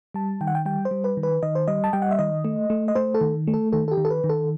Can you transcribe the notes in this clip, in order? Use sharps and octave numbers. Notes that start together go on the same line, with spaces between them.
G3 A5
D#3 G5
F#5
G5
G3 G5
C5
G3
B4
D#3
B4
D#3 D#5
C5
G3 D#5
A5
G3 G5
F#5
E5
D#3 D#5
A3
A3
D#5
A3 C5
A4
D#3
A3
A4
D#3 A4
A4
G4
D#3
A4
B4
D#3
A4